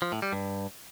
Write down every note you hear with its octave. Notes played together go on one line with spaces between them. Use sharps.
F3
A2
G3
G2